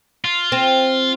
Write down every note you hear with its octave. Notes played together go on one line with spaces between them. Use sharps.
F4
C4